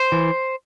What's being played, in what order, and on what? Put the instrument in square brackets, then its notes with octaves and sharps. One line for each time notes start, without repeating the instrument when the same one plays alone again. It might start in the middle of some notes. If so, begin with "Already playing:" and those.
Already playing: [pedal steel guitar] C5
E3